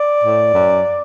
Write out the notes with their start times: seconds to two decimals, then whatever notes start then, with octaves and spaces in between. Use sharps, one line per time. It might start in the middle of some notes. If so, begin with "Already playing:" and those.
Already playing: D5
0.23 A2
0.54 F#2